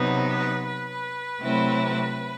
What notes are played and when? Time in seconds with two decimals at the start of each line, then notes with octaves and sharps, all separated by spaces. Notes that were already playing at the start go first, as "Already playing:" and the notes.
Already playing: C3 F#3 B3 D#4
0.27 B4
0.65 B4
1.41 C3 F#3 A3 C4 E4